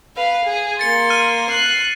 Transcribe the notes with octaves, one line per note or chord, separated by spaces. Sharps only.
B4 F5
G#4
A#3 C6 A6 C#7
F6 D#7
F#6 C7